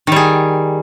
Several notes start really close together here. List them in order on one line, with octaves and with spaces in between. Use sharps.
D#3 G3 G#4